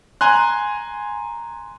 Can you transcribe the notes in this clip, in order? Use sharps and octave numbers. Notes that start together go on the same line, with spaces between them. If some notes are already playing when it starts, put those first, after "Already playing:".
G#5 A#5 C6 F#6